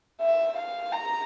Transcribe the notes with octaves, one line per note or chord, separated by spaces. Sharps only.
E5
F5
A#5